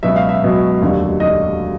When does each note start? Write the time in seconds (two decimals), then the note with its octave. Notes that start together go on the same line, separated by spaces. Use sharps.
0.03 C#2 B2 F#3 E5
0.16 F5
0.29 E5
0.43 C#2 B2 F#3
0.81 F1 D#2 D3 F#3
1.20 D3 F#3 D#5